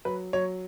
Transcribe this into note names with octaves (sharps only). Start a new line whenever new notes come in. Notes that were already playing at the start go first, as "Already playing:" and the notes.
F#3 B4
F#3 C#5